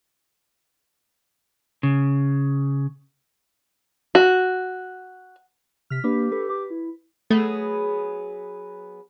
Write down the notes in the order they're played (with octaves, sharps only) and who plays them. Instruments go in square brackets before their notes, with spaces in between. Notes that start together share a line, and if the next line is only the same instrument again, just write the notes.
[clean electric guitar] C#3
[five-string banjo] F#4
[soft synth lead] C3 [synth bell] F6 B6
[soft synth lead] A#3 [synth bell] D4 B4 [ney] G4
[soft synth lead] A4 [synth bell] B4
[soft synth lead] D6
E4
[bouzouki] F#3 B3 G#4 [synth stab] A3